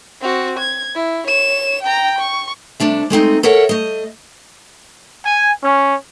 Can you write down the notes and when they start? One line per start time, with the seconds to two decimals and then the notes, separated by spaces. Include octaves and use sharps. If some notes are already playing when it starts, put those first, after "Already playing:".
0.21 C4 F#4
0.59 G#6
0.95 E4
1.27 C#5 E7
1.82 G5 A#5
2.18 C#6
2.80 C3 A3 D4 E5
3.10 G#3 A3 C4 D#4
3.43 A4 A#4 C#5 E5 F#5
3.69 A3 D#5
5.25 G#5
5.63 C#4